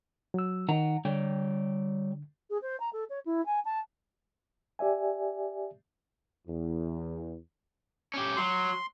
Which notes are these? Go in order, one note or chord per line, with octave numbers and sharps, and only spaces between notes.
F#3 E6
D#3 D#4 F#5 A#5
D3 G3 C#5 G5
G#4
C5
A#5
A4
C#5
E4
G#5
A5
G4 D5 E5 G#5
E2
C#4 G4
F#3 C6